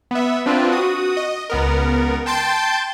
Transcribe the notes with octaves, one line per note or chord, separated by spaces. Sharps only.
B3 E5
C4 D4 F4 B4
F#4 D#6
D#5
C#2 B3 A#4
G5 A5 C6 G6 A6